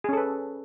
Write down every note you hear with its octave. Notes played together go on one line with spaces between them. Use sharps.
C#4 G#4 A4 B4